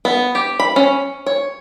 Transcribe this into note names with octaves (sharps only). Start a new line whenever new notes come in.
B3
G4
B5
C#4
C#5